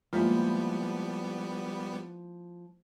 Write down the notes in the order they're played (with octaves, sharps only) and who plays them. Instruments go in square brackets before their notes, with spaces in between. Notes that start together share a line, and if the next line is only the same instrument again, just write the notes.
[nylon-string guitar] F3 E4 [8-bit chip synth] G3 B3 [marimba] G#3 A#3 F4